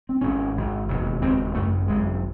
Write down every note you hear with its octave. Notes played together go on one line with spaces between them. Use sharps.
C4
G#1 G#2 C#4
G#1 G#2
E1 D#2 C#3
E1 D#2 C#3 C4
G#1 F#2 C#3 A3
G#1 F#2 C#3 G#3